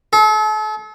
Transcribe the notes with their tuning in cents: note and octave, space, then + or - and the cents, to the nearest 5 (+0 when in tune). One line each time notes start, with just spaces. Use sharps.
A4 -40